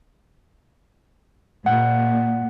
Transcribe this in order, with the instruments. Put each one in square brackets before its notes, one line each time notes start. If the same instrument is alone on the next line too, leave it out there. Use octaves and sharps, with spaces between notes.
[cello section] A#2 [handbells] F#5